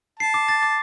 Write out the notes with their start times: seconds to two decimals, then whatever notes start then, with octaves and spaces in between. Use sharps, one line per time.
0.20 A5 C7
0.34 D6
0.48 A6
0.63 D6